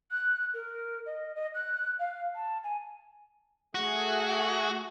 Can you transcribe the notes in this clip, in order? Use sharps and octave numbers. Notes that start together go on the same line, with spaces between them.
F#6
A#4
D#5
D#5
F#6
F5
A5
G#5
A3 F#4 G#4